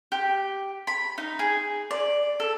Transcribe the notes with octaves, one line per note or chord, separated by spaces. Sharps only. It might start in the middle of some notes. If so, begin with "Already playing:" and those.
G4
B5
D#4
G#4
D5
A4